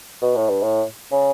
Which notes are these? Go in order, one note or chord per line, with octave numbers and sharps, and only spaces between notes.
B2
A2
G2
A2
C#3